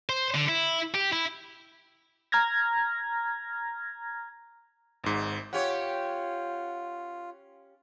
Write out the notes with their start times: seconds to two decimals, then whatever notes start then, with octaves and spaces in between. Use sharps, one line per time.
0.09 C5
0.35 D3
0.49 E4
0.94 G4
1.13 E4
2.32 A#5 F6 G#6 A#6
5.04 G#1 G#2
5.53 C#4 F4 G4 C#5 F#5